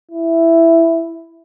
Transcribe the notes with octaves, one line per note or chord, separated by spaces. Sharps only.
E4